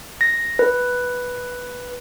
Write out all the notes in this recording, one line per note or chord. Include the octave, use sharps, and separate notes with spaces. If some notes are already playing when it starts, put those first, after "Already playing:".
A#6
B4